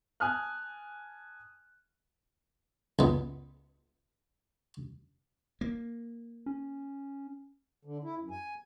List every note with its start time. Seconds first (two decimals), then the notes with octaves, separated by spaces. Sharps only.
0.20 G#5 A5 D#6 F6 F#6
2.99 C#2 B3
5.61 A#3
6.46 C#4
7.85 D3
8.04 E4
8.19 F#2
8.30 G#5